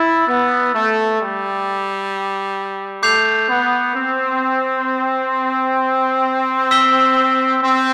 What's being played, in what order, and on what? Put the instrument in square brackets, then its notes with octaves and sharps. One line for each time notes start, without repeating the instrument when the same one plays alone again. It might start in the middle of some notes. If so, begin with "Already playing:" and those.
Already playing: [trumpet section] E4 [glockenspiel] E6 A6
[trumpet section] B3
A3
G3
[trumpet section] A3 [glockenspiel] D6 G6 C7 F7
[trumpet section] B3
C4
[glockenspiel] E6 B6 E7 G7
[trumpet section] C4